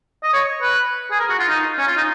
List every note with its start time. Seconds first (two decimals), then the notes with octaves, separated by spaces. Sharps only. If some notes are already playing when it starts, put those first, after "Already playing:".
0.23 D#5
0.33 C#5
0.62 B4
1.11 G#4
1.19 A#4
1.30 F#4
1.39 F4
1.49 D#4
1.78 C#4
1.88 F4
1.97 D#4